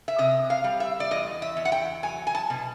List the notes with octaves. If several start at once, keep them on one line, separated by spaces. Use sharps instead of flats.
E5
C3 D#5
F5
G3
E5
D5
E2 D#5
E5
E2
F#5
G5
F#3 G#5
G#5
A5
B2